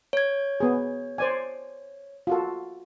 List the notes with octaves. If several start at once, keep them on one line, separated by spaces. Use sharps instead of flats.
C#5 G#6
B3 G#4
C5 D5 G#5
F4 F#4 A4